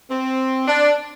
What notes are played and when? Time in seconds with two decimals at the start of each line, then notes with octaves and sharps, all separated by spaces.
0.10 C4
0.68 D4